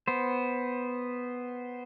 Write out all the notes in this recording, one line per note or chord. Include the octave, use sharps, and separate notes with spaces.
B3 C5